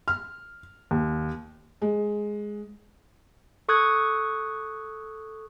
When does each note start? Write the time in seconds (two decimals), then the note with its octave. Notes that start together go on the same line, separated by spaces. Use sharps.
0.08 F6
0.91 D#2
1.82 G#3
3.69 A4 C#6 D#6 F#6 G#6